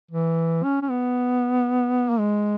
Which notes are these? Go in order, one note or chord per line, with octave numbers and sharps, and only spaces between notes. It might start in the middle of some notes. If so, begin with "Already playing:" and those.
E3
C#4
C#4
B3
A#3
G#3